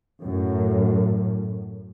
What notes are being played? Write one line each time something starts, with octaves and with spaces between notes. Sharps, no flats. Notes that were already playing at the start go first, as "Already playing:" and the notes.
F#2 A2